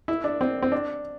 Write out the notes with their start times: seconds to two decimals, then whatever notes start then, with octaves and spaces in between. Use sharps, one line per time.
0.08 E4
0.24 D4
0.41 C4
0.62 C4
0.72 D4